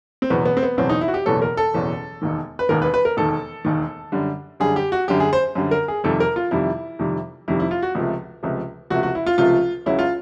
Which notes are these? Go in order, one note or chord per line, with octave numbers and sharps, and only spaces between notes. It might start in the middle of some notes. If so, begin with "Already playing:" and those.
C4
F#1 E2 B2 F#3 B3
B3
C4
B3
F#1 E2 B2 F#3 C4
D#4
E4
F#4
G4
F#1 E2 B2 F#3 A4
A#4
A4
F#1 E2 B2 F#3
E1 D#2 D#3
B4
E1 D#2 D#3 A#4
B4
B4
A#4
E1 D#2 D#3 A4
E1 D#2 D#3
F#2 D3 G3
F#2 D3 G3 G#4
G4
F#4
F#2 D3 G3 G4
G#4
C5
F#2 D3 G3
A#4
G#4
F2 C3 D#3 G3 A4
A#4
F4
F2 C3 D#3 G3 E4
F2 C3 D#3 G3
F2 C3 D#3 G3 E4
E4
F4
F#4
C#2 C3 F3 A3
C#2 C3 F3 A3
C#2 C3 F3 A3 F#4
F#4
E4
F4
C#2 C3 F3 A3 F4
C#2 C#3 F#3 E4
F4